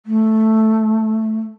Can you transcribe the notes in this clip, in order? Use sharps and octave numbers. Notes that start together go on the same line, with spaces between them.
A3